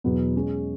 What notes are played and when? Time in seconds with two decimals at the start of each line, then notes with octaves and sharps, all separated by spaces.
0.04 E2 B2 F#3 B3
0.35 G#3 C#4 G#4